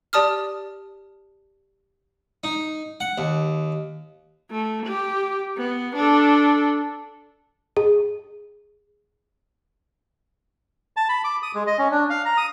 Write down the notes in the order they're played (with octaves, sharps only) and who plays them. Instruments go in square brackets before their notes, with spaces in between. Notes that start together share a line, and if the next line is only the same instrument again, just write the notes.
[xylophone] G4 D5 A5 D#6 F6
[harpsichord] D#4
F#5
D#2
[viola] A3
G4
B3
D4 A4
[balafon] G#4
[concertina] A5
B5
D6
D#6
G#3
D#5
C#4
D4
F5
A#5
D#6